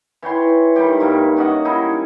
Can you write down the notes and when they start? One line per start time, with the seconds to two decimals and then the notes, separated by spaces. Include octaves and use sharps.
0.22 E3 C#5 G5 C6
0.76 D#3 G3 G4
1.00 G2 G3 A#3
1.37 C#4 F#4 D#5 F#5
1.65 G3 D#4 E4 G#4